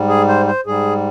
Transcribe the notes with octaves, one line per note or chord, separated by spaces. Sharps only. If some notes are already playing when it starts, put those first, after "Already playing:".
Already playing: G#2 G3
G#4
C5
C5
G#2 G3 G#4